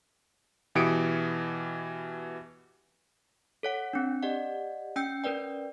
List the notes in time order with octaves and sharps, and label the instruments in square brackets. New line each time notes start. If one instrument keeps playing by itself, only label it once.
[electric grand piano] B2 E3 G4 D#6 C#7 D7
[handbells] A4 C#5 F#5
C4 D4
G4 D5 D#5 F#5
C#4 G5 E6 G6 C#7
C#4 A#4 B4 D5 G5